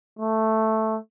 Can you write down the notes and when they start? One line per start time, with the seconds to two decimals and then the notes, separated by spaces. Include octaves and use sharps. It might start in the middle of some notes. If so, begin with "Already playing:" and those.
0.19 A3